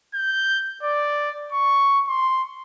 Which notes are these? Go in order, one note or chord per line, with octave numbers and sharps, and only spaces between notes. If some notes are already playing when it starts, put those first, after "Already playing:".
G6
D5
C#6
C6